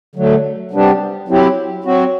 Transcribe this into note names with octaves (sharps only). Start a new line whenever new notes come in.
D3 F#3 A3
C3 G3 B3 D4 G4
F#3 C4 E4 G4
F#3 C4 F#4